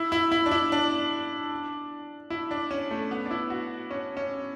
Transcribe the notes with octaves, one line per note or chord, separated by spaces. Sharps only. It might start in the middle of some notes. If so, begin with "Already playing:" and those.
Already playing: E4
E4
E4
D4
E4
D4
E4
D4
C#4
A3
B3
D4
E4
F#4
C#4
C#4